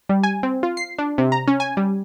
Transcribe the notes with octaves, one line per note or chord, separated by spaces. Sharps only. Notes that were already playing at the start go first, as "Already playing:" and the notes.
G3
G#5
C4
F4
C7
D4
C3
A#5
C#4
G#5
G3